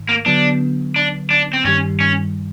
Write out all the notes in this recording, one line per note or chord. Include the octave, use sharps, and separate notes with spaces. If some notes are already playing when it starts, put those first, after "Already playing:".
Already playing: G#2 D#3
A#3
D3 F#3 B3 D4
D4
D4
C4
G2 D#3 G3 C#4
C#4